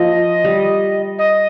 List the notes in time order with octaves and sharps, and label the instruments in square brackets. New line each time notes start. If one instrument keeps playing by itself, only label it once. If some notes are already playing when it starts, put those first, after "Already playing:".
Already playing: [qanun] F3 A#3 [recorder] D#5
[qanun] G3
[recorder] D#5